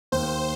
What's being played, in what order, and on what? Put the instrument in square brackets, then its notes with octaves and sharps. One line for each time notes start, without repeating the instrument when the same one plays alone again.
[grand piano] D#2 [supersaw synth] C5